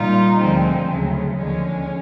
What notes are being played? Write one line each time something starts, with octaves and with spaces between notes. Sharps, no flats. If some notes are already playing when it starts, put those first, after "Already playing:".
Already playing: A#2 G3 D#4 F4
D2 D3 F3 G#3 C4
D2 C#3 F#3 C#4
D#2 D3 F3 G#3 C#4